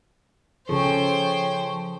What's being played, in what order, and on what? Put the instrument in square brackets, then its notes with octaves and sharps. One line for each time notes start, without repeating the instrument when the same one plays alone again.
[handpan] C#3 G#4 A4 [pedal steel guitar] F3 [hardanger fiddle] C5 G5 [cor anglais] C#5